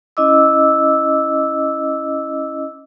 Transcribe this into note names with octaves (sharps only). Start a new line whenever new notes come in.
C#4 E4 D#5 D6 E6